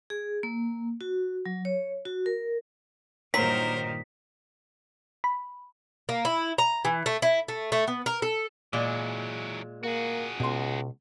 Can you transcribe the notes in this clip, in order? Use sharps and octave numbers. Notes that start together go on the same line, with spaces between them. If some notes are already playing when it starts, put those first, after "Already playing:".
G#4
A#3
F#4
F#3
C#5
F#4
A#4
G2 A#2 D#3 F#3 A#4 C5 B6
B5
A#3
E4
A#5
E3
A3
E4
A3
A3
B3
A#4
A4
A#2 E3 F#3 G#3
A#3 F#4 G#4
C#2 B2 C6